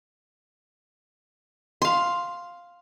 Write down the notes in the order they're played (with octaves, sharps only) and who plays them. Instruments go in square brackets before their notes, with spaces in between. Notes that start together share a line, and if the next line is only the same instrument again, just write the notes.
[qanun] F5 C6